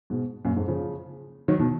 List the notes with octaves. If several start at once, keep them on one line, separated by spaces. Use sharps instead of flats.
G#2 B2
F#2 A#2
F2 G#2
C#3 F3
D#3 F#3
B2 D#3